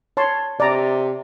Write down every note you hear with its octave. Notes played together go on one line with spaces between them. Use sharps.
C#5 A5 C6
C3 D5 A#5